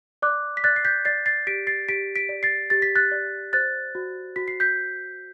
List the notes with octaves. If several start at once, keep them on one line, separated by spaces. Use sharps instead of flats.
D5 D6 F#6
B6
D5 F#6 A6
C7
G6 B6
D5 A6 C7
A6 C7
G4 B6 D7
A6 C7
G4 B6 D7
B6 D7
D5
A6 C7
G4 A6
B6
F#6 A6
D5
C5 F#6 A6
F#4
F#4 B6
C7
G6 B6